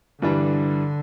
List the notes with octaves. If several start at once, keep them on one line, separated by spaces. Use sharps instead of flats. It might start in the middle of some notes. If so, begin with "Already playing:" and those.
G2 D3 E3 G3 D4